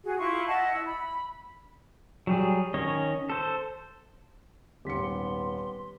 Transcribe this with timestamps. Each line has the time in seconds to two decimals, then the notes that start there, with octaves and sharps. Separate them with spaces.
0.03 F#4 G#4
0.18 E4 F4 C#6
0.47 D#5 E5 F#5 A5
0.74 E4 E6
0.86 B5
2.27 F#3 G3 G#4
2.74 D#3 C#4 C#5 D#5
3.30 A4 C5
4.85 D#1 G#2 B3 G4 C6 B6 C#7